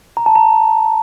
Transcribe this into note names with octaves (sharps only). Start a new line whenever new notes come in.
A#5
A5
A#5